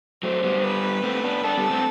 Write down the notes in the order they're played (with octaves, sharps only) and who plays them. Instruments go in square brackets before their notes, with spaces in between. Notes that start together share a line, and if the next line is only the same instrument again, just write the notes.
[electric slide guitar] F#3 A3 [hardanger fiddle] C5
[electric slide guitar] G3 B3
[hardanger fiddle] B4
[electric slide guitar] A3 C4
B3 D4
[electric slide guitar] B3 D4 [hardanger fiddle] A4
[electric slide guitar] G3 B3
A3 C4